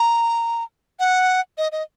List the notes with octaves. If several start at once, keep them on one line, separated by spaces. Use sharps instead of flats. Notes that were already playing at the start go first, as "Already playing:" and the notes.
Already playing: A#5
F#5
D#5
D#5